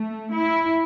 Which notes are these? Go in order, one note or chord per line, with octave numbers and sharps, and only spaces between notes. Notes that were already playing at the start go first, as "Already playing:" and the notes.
Already playing: A3
E4